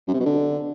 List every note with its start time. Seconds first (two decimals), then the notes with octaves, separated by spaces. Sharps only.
0.08 F#2
0.14 C3
0.20 B2
0.26 D3